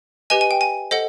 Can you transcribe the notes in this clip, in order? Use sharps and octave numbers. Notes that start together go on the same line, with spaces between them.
G4 B4 D#5 G#5
G#5
G5
G#5
A4 C5 D#5 F#5